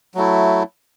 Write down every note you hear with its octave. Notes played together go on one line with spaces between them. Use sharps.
F#3 A3 E4